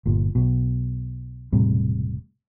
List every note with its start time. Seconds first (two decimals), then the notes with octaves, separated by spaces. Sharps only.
0.06 G1 A#2
0.35 B1 B2
1.53 E1 A2 C3 G3